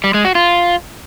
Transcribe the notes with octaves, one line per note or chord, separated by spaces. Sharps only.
G3
G#3
F#4
F4